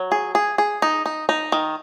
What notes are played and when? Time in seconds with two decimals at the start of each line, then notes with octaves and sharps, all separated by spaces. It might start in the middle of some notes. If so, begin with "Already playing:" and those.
Already playing: F#3
0.12 G#4
0.35 G#4
0.58 G#4
0.82 D#4
1.06 D#4
1.29 D#4
1.52 D#3